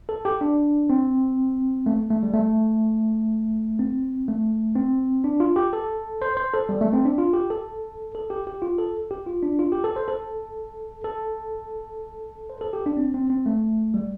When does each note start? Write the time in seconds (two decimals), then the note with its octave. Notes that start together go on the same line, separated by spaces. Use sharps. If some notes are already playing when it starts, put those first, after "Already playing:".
0.09 A4
0.25 G4
0.41 D4
0.90 C4
1.86 A3
2.11 A3
2.23 G3
2.34 A3
3.79 C4
4.28 A3
4.76 C4
5.24 D4
5.40 F4
5.56 G4
5.73 A4
6.22 C5
6.37 C5
6.53 A4
6.69 G3
6.81 A3
6.93 C4
7.05 D4
7.18 F4
7.33 G4
7.50 A4
8.15 A4
8.30 G4
8.47 G4
8.62 F4
8.79 A4
9.11 G4
9.26 F4
9.43 D4
9.59 F4
9.72 G4
9.84 A4
9.96 C5
10.08 A4
11.04 A4
12.50 C5
12.61 A4
12.73 G4
12.86 D4
12.97 C4
13.14 C4
13.30 C4
13.46 A3
13.94 G3